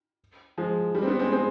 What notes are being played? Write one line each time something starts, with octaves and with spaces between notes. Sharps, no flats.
F3 G#3
G3
C4
G3 B3
G#3 C4
G#3 C4